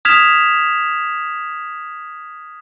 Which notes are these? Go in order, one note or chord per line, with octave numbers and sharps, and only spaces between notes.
D#6 F6 G#6 B6 E7 F7